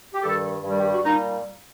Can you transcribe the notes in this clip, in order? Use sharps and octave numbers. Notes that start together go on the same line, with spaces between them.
G4
G2 D#3 G3 A4
G2 D#3 G3
G4
F#4
A#2 G3 D#4